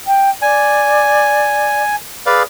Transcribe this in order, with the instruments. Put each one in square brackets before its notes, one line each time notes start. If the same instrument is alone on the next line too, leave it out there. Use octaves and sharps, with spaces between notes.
[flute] G5
[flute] D5 [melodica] G#5
[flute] G#4 [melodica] B4 D5 F5